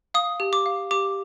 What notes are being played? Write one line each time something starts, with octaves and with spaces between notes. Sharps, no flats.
F5 D#6
G4
D6
F5
G4 D6